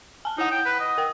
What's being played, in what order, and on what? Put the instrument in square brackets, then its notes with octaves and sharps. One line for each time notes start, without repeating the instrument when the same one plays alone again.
[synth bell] G#5 A5
[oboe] D#4 [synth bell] E4 F#5
[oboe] G5
B4
D#5
[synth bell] A#4 G5